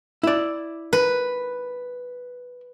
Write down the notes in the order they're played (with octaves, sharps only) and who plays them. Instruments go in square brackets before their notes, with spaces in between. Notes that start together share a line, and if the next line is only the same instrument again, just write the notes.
[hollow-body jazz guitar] E4 D5
[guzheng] B4